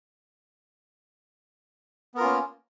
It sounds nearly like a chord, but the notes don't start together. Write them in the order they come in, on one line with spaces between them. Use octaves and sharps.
B3 A#4 F4 C#4 A#3